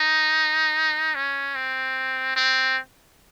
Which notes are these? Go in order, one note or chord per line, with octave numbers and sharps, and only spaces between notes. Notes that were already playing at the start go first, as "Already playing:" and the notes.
Already playing: D#4
C#4
C4
C4